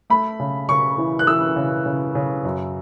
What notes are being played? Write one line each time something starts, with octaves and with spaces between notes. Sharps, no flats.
A3 B5
C#3
C#3 C#6
E3
F#6
E3 E6
C#3
C#3
C#3
F#2